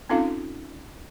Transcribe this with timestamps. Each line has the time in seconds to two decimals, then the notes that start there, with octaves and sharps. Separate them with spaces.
0.10 C4 C#4 D#4 F4 A4 F5